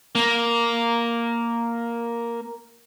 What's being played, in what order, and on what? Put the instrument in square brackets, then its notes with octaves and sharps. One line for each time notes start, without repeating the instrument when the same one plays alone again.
[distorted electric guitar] A#3